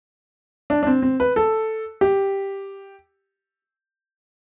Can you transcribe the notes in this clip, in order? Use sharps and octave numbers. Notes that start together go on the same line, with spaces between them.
D4
D4
C4
C4
B4
A4
G4